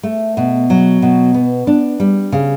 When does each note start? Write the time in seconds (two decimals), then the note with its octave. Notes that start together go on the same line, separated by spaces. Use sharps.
0.03 A3
0.37 B2
0.70 F#3
1.02 B2
1.34 B3
1.67 D4
2.00 G3
2.32 C#3